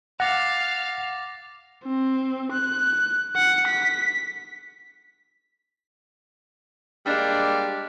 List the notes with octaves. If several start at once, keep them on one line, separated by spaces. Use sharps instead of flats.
F5 F#5 D6 F6 A6 A#6
C4
F#6
F#5
B6
G3 G#3 A#3 D4